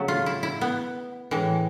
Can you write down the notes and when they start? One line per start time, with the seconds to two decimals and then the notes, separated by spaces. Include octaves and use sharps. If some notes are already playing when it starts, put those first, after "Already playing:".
Already playing: C#3 F#3 A3
0.08 F4
0.26 E4
0.43 E4
0.61 B3
1.31 A2 E3 G#3